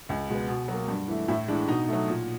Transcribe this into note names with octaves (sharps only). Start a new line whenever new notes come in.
C#2
B2 G#3 B3
B2
F#3
A#3
G2
E3 A3
A2 E4
E3 G#3 D4
B2 D#4
F#3 A3
A#2